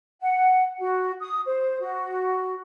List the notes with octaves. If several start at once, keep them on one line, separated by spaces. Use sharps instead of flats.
F#5
F#4
D#6
C5
F#4